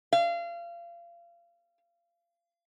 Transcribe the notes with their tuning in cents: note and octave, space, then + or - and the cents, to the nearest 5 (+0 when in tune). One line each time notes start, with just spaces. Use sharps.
F5 -30